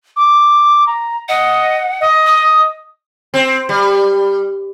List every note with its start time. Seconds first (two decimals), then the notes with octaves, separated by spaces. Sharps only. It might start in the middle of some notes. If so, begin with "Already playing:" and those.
0.16 D6
0.87 A#5
1.29 D#5 F#5
2.01 D#5
2.26 D#6
3.34 C4
3.69 G3